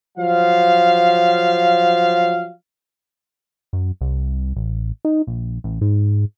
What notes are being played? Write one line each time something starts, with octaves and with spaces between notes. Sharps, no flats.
F3 F#3 F5
F#2
C2
A1
D#4
A#1
A1
G#2